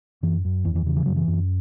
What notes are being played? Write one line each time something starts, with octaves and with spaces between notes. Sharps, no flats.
F#2 E3
F#2
E2 E3
E3
C#3 E3
E3
F#2 F#3
E3
F#2